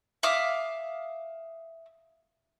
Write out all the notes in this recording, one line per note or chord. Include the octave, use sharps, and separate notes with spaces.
E5 F5 D6 D#6